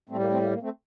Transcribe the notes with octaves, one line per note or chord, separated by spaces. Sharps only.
A2 G3 A3 C4
A#3
A3 C4
A#3
A#3
A3 C4